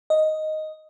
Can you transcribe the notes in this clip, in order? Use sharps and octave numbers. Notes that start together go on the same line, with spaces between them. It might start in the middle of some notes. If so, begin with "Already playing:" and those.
D#5